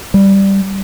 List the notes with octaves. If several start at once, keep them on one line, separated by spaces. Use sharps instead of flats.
G3